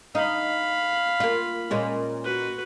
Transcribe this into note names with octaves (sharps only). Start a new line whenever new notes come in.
D#4 F5 B5
A#3 F4
A#2 G#3 C#4
F#4 B4